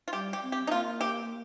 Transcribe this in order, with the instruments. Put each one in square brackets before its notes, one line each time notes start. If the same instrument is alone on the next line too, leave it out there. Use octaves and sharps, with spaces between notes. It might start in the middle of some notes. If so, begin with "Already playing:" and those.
[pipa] F4
[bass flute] G3 [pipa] G4
[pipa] G4
[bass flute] C4
[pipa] G4
D#4
[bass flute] A#3 [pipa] F4
[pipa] G4